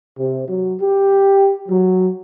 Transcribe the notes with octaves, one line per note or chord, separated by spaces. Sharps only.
C3
F#3
G4
F#3